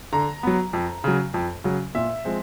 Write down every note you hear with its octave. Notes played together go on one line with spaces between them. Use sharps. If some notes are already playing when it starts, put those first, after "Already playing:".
D3 A#5
F#3 B3
F2
C#3 F#3
F2
C#3 F#3
A#2 E5
F3 G#3 C4